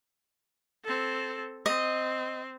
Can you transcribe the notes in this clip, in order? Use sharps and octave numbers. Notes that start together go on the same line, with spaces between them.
C4 A4
C4 D#5